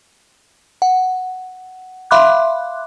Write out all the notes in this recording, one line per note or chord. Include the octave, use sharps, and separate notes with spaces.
F#5
E5 F5 B5 C6 D6 F#6